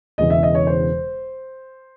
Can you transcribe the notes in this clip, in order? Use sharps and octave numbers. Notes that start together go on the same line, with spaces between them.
E1 E2 C#3 E3 D#5
E5
D#5
C#5
C5